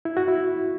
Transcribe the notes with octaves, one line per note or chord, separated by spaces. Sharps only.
E4
F#4
E4